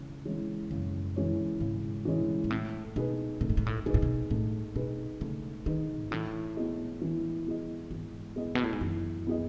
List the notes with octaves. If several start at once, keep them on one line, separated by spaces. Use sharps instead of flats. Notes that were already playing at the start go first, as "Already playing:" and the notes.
Already playing: C#3 E3 G#3
E3 G#3 C#4
F#2 C#3
E3 G#3 C#4
G#2 C#3
E3 G#3 C#4
G#2
A2 A3
B2 D#4 G#4 B4
B2 A3
A2
G#2
A2
B2 D#4 G#4 B4
A2
B2
A2 A3
B2 D#4 G#4 B4
C#3 A3
D#3 D#4 G#4 B4
G#2
A2 E3
B3 E4 G#4 D#5
E3
B3 E4 G#4 D#5
G#2 E3
B3 E4 G#4 D#5
B2
A2
G#2
F#2 E3
B3 E4 G#4 D#5